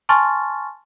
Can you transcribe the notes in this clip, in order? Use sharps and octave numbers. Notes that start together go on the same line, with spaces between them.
G#5 A5 C6 C#6 F6 A6